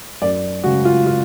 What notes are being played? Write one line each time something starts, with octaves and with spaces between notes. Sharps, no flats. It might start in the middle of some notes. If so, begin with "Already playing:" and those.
F#2 D5
C#3 G#3 F#4
F4
F4